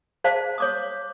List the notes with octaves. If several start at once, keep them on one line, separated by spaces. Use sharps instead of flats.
G#4 C5 D5 F5 A5
C#5 D6 D#6